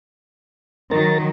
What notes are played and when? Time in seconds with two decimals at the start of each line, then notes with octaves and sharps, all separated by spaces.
0.91 D#3 F#3 A#4 A#5 A6